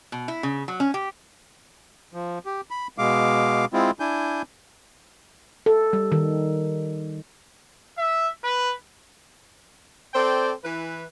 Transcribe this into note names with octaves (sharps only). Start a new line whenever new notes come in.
B2
E4
C#3
F#3
C#4
G4
F3
G4
B5
B2 G#3 F5 D6
G#3 C4 E4 F4
D4 E4 G#5 G6
A4
G3
D#3
E5
B4
C4 A4 C5 D5 G5
E3 B4